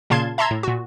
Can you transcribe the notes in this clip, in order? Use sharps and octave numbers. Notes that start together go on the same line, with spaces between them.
A#2 C#3 F5 A5 C6 G#6
E5 A5 A#5 C6 E6 G#6
A2
A#2 F#4